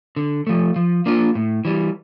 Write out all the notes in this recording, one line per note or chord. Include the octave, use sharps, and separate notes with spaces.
D3
F3 A3
F3
A#3 D4 F4
A2
E3 G3